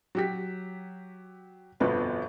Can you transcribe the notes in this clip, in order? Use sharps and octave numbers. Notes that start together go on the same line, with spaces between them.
F#3 G4 B6
G1 F2 B2 B3 B4